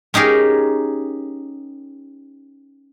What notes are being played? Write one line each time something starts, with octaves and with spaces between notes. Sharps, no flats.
C#4 D#4 G4 G#4 A#4